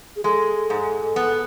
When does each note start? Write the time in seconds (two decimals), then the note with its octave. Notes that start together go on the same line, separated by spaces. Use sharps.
0.16 G#4
0.24 G#3 A4
0.70 G#2
1.16 B3